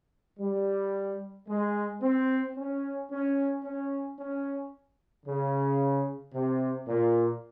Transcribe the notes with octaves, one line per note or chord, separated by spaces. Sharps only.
G3
G#3
C4
C#4
C#4
C#4
C#4
C#3
C3
A#2